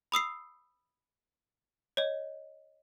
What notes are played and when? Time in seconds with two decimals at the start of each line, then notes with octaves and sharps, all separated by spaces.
0.12 B5 D#6 E6 C7
1.97 C#5 D#5